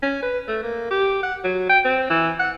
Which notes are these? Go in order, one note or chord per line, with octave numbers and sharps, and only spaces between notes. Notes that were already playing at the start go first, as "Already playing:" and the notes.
C#4
B4
A3
A#3
G4
F#5
F#3
G5
C4
E3
F#5